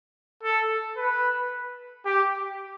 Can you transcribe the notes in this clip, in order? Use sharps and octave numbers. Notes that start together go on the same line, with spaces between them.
A4
B4
G4